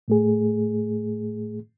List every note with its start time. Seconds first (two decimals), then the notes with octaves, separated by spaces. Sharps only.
0.08 A2 A3 G#4